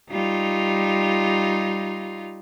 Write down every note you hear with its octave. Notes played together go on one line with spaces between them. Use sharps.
G3 D#4 F4